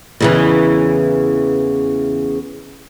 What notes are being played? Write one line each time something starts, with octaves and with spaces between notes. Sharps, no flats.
E2 C#3 E3